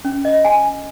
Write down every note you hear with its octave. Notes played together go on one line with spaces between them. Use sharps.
C#4
D#5
G#5